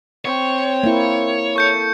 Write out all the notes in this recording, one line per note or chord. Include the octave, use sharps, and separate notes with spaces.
C4 C#5
A#3 E4
A4 C#6 G6 C#7